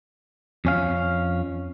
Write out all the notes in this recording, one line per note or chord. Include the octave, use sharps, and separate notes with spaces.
F2 C#4 F5